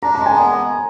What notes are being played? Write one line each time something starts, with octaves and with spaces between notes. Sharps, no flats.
D4 A#5
A#5
G#3
G#5
B3